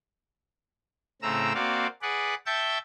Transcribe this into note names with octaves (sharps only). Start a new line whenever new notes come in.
A2 C#3 C4 A#5 E6
A#3 C4 F#4 D5 F5
G#4 B4 D5 F#5
E5 G5 A5 C#6 E6 G6